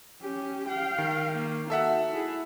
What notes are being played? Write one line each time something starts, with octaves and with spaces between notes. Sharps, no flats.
C#4 G4
F5 G5
D#3
A#3
D#4 F#4 A4 E5 F#5
E4 G#4